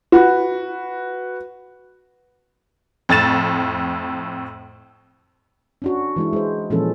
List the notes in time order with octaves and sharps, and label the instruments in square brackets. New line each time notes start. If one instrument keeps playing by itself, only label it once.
[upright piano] F#4 B4
[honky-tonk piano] F2 A2 A6 E7
[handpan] C#4 D4 F#4
E3 G#3 E4
G#3 C5
A#2 E3 F3 G#3 C#4 A4